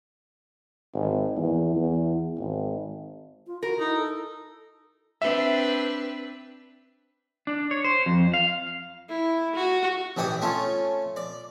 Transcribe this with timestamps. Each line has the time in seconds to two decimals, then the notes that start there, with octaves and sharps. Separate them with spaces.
0.94 G#1
1.37 E2
1.76 E2
2.38 G#1
3.47 F4
3.63 F#4 A#4
3.80 D#4 E4
3.96 A4
5.22 C4 D4 B4 E5
7.47 D4
7.71 C#5
7.84 C5
8.06 F2
8.34 F5
9.09 E4
9.55 F#4
10.17 A1 E3 D5 G5 D#6
10.42 A3 C#4 F4
11.16 D5